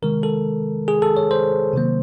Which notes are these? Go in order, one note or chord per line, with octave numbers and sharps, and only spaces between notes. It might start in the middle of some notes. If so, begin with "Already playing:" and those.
C3 D#3 G#3 A#4
A4
G#4
A4
C#5
C5
C3 D#3 F#3 A#3